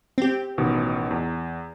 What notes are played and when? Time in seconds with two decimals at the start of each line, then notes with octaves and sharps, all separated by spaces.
0.18 C4 G4
0.58 A1 B2 D#3
1.11 E2